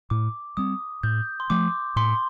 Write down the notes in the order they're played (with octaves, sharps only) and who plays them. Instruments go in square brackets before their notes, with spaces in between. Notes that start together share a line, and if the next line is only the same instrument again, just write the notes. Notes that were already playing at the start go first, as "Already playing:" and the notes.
[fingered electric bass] A2 [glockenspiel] D6
[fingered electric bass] G3 C4 [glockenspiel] D#6
[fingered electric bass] A2 [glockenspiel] G6
[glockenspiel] C6
[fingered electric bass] F3 A3 [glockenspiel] D6
[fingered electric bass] A2 [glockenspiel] C6